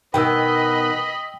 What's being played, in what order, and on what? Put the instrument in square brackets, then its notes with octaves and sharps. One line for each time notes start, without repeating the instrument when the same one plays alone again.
[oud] B2 D#3 [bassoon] B4 [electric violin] D#5 B5 [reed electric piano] G5 E6